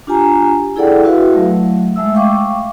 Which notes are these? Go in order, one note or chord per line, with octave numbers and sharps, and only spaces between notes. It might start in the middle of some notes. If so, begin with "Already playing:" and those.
D4 F4 G4 G#5 A#5
E4 G#4 A4 D5 F#5 G5
E4 F#4 B4 E5 F5
F#3 A3
G#3 A3 E5 E6
F5 G5 C#6 D6